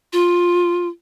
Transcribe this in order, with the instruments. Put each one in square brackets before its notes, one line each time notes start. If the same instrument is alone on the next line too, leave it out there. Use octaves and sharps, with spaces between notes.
[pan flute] F4